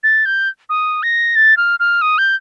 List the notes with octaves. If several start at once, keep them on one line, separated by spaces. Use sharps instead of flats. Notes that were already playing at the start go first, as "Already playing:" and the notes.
A6
G6
D#6
A#6
A6
F6
F6
D#6
G6